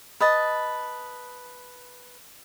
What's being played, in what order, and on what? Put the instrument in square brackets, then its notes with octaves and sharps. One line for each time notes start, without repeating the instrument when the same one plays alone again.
[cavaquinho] B4 D#5 A5